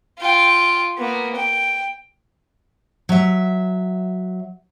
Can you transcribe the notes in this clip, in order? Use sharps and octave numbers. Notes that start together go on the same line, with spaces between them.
F4 G5
A#3 B3
G5
F#3 E5